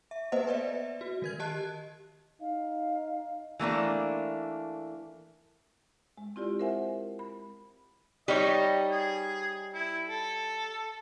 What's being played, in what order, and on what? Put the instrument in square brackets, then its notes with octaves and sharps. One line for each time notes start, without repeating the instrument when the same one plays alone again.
[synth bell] E5
A#3 B3 B4 C5 D#5 F#5
B4 D5 E5
F#4
D#3 A#4 G#6
G4 D#5 A5 F#6
[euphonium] D#4 [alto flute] F5
[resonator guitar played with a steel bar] E3 A3 A#3 D4
[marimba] G#3
C4 E4 F4 G4 D5
A#4 C5 E5 F#5 G#5
B5
[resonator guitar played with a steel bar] G3 D#4 C#5 [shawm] D#5
[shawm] G#4
E4
A4